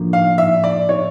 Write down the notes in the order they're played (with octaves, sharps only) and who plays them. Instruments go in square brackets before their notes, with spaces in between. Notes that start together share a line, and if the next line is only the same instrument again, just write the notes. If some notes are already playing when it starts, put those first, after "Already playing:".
Already playing: [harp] A2 F3 A#3 D4
[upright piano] F5
E5
D5
C#5